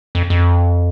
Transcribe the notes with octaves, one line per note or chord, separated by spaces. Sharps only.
F2
F2